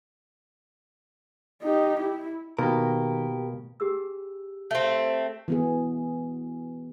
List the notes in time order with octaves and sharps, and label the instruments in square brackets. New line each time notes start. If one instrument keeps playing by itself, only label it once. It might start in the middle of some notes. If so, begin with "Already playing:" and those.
[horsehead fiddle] D#4 G4
E4
[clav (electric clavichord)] B2 A#3 [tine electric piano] D#3 [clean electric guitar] G4 A#4
[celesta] G4 G#4 E6
[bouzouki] A3 C4
[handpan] E3 B3 G#4